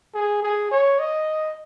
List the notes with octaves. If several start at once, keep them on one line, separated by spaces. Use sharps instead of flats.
G#4
G#4
C#5
D#5